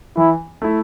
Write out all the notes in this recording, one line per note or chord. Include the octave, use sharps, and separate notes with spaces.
E3 E4
A3 E4